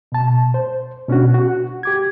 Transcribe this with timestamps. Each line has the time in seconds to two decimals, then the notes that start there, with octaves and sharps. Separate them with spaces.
0.12 B2 A5
0.54 C5
1.08 B2 C#4 D4 F#4
1.34 F#4
1.83 G4 D6 G#6